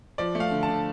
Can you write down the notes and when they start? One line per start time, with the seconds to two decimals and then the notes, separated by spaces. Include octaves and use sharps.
0.18 F3 D5
0.35 A3
0.40 F5
0.51 D3
0.63 A5
0.68 D3